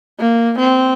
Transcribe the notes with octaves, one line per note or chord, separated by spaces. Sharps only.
A#3
C4